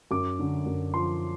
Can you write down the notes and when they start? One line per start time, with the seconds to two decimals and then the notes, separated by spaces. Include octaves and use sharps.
0.11 F#2 D6
0.39 D3
0.66 F#2
0.94 F3 C6